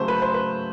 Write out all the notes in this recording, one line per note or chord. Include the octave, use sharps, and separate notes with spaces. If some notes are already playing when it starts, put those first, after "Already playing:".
Already playing: C#3 F#3 A3 C#4 C5
B4
C5
B4